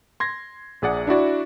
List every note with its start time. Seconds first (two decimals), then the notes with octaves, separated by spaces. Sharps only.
0.20 C6 G#6 A#6
0.82 A#1 G#4 D5 F#5
1.07 D4 E4 F#4 D5